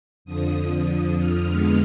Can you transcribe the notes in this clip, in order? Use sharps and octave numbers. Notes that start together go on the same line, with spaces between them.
F2 D3 F3 D#6
F6
F2 D3 G#3 B3